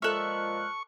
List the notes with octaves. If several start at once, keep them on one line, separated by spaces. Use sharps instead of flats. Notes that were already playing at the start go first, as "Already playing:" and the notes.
A#2 F3 G#3 A4 E5 C#6 F6 F#6